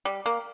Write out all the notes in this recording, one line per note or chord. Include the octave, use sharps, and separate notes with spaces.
G3
A#3